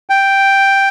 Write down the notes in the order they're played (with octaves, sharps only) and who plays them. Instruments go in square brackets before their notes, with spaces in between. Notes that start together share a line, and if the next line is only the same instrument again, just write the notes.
[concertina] G5